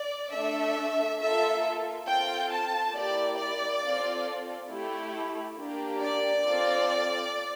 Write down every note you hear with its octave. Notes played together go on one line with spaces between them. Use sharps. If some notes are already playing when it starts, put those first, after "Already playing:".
Already playing: D5
A3 D4 A4 E5
A#3 F4 A4 E5
C4 F4 A4 G5
A5
A#3 E4 G4 D5
D5
C4 F4 A4
A3 E4 G4
A#3 D4 G4
D5
C4 F4 A4